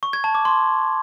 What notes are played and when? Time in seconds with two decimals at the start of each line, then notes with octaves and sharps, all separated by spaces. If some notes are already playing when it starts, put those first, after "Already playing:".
0.03 C#6
0.13 G#6
0.24 A5
0.35 D6
0.45 C6